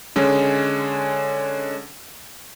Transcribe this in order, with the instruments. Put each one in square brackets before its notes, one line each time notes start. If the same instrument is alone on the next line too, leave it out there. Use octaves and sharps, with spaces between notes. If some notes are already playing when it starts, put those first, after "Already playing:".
[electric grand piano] D3 G#3 C#4